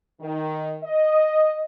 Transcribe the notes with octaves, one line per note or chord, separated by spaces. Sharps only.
D#3
D#5